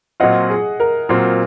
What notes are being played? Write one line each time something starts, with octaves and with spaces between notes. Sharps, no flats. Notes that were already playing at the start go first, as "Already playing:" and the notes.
A#2 F#3 C4 F4 D#5 F#5
G#4
A#4
A#2 F#3 C4 F4